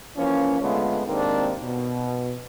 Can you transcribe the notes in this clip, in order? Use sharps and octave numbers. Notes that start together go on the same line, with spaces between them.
E3 F3 A#3 C#4
C#2 D3 G#3 A3 B3 F4
G#2 C3 D#3 A#3 C4 D4
B2